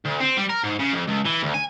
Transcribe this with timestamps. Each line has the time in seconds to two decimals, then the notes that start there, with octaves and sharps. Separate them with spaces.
0.05 D2
0.20 C4
0.37 G3
0.49 A#4
0.63 G#2
0.79 C#3
0.93 F2
1.07 C#2
1.25 E3
1.43 D2
1.54 G#5